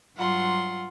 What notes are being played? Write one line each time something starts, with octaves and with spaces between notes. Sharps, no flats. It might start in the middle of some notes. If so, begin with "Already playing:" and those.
G2 F#3 F4 F#5 C6